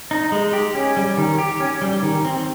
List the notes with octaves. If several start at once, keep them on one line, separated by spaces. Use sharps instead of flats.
D#4
G#3
G4
C#4
G3
D#3
G4
C#4
G3
D#3
C4